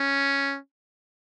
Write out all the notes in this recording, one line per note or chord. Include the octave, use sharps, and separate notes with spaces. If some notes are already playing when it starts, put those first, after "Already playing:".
Already playing: C#4